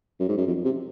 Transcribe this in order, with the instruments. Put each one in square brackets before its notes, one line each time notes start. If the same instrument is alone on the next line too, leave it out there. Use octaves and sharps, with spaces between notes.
[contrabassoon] F#2
G#2
F#2
F2
C3